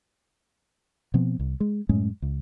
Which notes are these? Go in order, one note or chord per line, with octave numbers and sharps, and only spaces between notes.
B2 F3 B3 C4
C2
G#3
F#2 A2 G#3 C#4
C#2